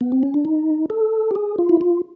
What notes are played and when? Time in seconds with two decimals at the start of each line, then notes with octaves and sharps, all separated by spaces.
0.01 B3
0.12 C4
0.23 C#4
0.34 D4
0.45 D#4
0.90 A4
1.31 G4
1.35 G#4
1.58 F4
1.69 E4
1.81 F4